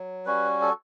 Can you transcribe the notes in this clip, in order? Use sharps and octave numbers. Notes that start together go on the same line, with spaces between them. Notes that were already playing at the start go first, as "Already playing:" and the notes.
Already playing: F#3
G3 C#4 F#4 B4
A4